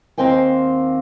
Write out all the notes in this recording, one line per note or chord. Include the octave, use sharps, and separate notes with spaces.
D#2 A#3 C4 C5 G5 G#5